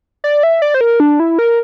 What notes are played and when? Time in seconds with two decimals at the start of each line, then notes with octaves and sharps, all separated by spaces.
0.24 D5
0.43 E5
0.62 D5
0.74 C5
0.81 A#4
1.00 D4
1.20 E4
1.39 A#4